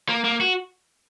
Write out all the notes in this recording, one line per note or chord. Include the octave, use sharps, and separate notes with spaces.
A#3
A#3
F#4